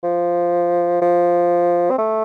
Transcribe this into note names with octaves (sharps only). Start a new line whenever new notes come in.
F3
F3
C4
A3